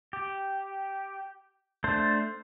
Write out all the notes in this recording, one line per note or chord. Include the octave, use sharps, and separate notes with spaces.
G4
A3 D4 C5